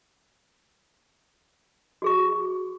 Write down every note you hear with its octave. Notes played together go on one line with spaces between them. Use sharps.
F#4 G#4 C#6